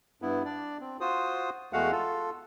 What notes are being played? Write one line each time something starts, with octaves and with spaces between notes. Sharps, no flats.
G2 B3 E4
D4 D5
C4
F4 F#4 C5 D#6
E2 G#3 A3 F#4 F5 F#5
F4 A4